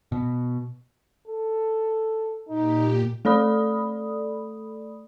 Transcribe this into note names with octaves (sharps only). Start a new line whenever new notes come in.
B2
A4
A#2 D#4 G4
A3 A4 D5 B5 D#6